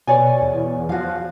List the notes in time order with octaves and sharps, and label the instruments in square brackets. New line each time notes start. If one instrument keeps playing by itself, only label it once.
[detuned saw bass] B2 [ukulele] C#5 D5 G#5
[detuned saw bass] E2
[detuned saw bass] F3 [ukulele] F#4 F5